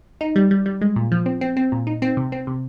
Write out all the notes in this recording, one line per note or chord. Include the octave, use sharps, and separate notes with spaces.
D#4
G3
G3
G3
G#3
A#2
F3
C4
C4
C4
A#2
D#4
C4
C3
C4
C3